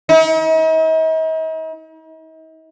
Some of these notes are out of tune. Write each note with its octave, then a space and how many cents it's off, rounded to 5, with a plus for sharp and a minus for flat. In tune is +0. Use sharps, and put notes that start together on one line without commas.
D#4 +45